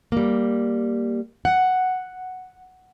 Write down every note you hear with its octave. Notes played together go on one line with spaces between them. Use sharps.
G3 A#3
F#5